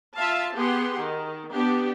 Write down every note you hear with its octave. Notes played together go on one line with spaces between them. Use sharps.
F4 E5 F5 A5
B3 G4 G#4 F#5 C6
D#3
B3 D4 G4